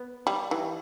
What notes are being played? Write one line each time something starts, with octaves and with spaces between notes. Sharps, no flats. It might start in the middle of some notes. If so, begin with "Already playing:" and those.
Already playing: B3
G3
E3